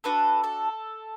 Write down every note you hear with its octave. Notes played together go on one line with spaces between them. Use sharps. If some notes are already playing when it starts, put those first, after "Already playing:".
D4 F#4 A4 B4
A4